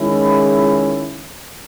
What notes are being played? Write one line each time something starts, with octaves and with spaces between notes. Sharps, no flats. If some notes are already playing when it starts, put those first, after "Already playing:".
Already playing: D#3 G#3 C#4 E4